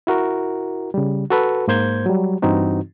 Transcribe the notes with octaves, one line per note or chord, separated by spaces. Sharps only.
E4 F#4 A#4
C#3 G3
F#4 A4 B4
G#2 A#3 C5 G6 G#6
F#3 G3
G2 E3 C4 D#4 F#4